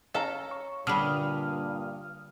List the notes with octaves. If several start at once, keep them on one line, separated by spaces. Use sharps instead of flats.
C#4 A4 F5 A#5
C#6
G2 A#2 D3 G3 D#6 F6